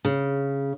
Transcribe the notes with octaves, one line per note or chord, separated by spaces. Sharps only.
C#3